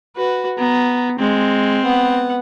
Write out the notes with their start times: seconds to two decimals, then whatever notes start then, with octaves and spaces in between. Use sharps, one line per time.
0.16 F#4 B4
0.58 B3 A#5
1.19 G#3 C4
1.83 B3 F#5